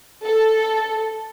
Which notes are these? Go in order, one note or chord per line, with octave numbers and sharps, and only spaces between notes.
A4